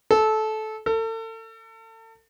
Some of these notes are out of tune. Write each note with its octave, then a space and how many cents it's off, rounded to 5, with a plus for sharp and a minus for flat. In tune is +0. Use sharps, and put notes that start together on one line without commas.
A4 -20
A4 +35